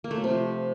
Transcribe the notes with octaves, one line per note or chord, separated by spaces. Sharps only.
A#3
A3
F#3
C3
F3